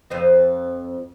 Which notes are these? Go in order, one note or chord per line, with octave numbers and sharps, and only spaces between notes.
F2 C5 D#5